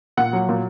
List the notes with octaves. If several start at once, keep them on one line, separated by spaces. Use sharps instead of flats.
A#2 F#5
F#3
A#2